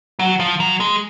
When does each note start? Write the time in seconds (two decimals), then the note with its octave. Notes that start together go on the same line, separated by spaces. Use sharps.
0.19 F#3
0.40 F3
0.60 F#3
0.80 G#3